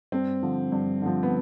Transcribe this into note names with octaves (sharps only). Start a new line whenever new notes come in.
G2 C4
D3 F3
G2
D3 F3
B3